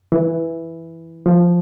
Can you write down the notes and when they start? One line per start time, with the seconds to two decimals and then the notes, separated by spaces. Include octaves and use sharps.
0.12 E3
1.26 F3